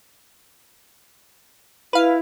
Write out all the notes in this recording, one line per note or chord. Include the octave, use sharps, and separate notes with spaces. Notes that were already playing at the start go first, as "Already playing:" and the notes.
E4 B4 F5